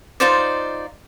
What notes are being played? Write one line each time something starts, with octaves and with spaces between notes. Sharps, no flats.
D#4 F4 C5 D5